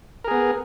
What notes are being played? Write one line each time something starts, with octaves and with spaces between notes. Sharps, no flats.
B3 G#4 A#4